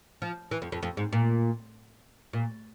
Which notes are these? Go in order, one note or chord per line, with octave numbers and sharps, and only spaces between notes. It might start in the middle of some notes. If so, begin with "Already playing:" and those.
F3
E3
F2
F2
F2
G#2
A#2
A#2